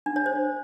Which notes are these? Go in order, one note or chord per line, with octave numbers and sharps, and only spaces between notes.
D4
C#5
C5